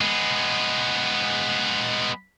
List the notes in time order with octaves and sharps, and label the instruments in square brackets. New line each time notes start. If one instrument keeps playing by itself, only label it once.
[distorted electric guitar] G#3 B3